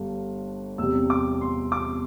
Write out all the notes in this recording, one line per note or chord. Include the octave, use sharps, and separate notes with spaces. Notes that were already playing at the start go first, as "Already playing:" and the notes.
Already playing: G1 G2 D3 G3
E2 C3 G3 E6
D6
C6
D6